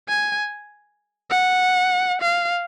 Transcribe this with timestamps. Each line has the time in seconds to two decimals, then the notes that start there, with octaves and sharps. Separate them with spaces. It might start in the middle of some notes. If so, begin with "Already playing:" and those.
0.09 G#5
1.30 F#5
2.21 F5